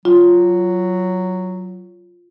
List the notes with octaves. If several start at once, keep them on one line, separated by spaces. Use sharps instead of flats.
F#3 F4